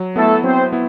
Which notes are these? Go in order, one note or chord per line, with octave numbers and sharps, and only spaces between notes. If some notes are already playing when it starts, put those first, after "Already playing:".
Already playing: F#3
A3 B3 E4 A4
F#3 C4 C5
B3 E4